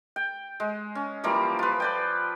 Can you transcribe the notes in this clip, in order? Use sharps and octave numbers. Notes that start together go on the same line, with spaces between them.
G5
G#3
C#4
E3 F3 G3 A#3
F4 B4
B4 D5 G5